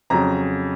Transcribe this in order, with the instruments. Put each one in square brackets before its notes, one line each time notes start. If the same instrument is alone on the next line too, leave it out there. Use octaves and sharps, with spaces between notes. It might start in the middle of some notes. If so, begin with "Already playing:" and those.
[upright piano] F2 C#3 F#3 A#5